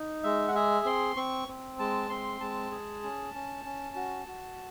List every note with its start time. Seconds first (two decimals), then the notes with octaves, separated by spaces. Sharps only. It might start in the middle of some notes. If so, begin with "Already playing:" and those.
Already playing: D#4
0.23 G#3 E5
0.48 F#5
0.55 G#4 E5
0.85 C4 C6
1.16 C4 C#6
1.48 C4
1.79 G#3 A5
2.10 C4 C6
2.40 G#3 A5
2.71 G#4
3.04 C#4
3.34 C#4
3.65 C#4
3.96 F#4
4.27 F#4